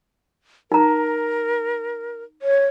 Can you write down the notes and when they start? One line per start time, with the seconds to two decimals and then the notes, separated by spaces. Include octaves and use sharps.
0.72 D#4 A#4 A#5
2.42 C#5